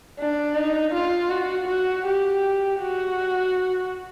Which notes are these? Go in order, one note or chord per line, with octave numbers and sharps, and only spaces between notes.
D4
D#4
F4
F#4
F#4
G4
F#4